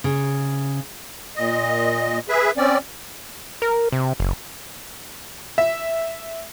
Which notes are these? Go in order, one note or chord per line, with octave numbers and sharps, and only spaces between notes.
C#3
A#2 D#5
G#4 B4 E5
C4 C#4 D5
A#4
C3
F#1
E5